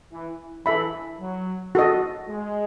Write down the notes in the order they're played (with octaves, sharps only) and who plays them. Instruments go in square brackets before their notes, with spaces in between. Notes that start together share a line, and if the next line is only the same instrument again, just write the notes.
[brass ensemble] E3
[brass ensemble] E3 [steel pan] A4 E5 B5
[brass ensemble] F#3
[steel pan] F#4 A4 D#5
[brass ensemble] G#3